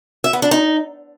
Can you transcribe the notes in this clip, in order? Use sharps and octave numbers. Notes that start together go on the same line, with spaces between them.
E5
B3
D4
D#4